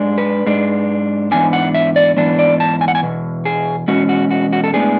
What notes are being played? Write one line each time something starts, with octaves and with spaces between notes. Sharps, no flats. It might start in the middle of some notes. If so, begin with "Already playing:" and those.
Already playing: G#2 G#3 D4
B4
G#2 G#3 D4
G#2 E3 B3 D4 G#5
F#5
E5
D5
G#2 E3 B3 D4
D5
A5
G#5
F#5
G#5
E2 B2
G#4
E2 B2 G#3 C#4 F#4
F#4
F#4
F#4
A4
A2 G#3 B3 D4 G#4